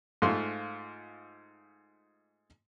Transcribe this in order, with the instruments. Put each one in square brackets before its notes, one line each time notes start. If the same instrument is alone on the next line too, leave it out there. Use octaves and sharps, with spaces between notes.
[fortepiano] G#2 A3 F4 C6